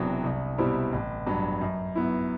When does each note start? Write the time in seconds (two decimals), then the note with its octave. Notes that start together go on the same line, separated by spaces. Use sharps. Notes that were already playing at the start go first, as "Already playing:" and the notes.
Already playing: E1 E2 C3 F#3
0.24 C2
0.58 B2 G3 C4 E4
0.92 A1
1.27 G2 F#3
1.61 F#2
1.95 F#3 B3 E4